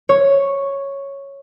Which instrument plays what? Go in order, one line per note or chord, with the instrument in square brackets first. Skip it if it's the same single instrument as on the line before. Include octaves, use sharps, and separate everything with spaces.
[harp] C#5